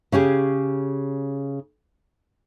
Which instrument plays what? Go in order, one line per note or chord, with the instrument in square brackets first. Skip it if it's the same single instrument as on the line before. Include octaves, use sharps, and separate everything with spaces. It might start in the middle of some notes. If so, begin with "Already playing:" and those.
[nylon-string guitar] C#3 C#4 G4 G#4